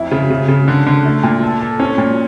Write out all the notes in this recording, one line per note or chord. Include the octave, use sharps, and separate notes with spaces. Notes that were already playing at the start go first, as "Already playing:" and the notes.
Already playing: F2 E4
C#3
C#3
C#3
D3
D3
A3
A#2
A4
A4
C#4
A#2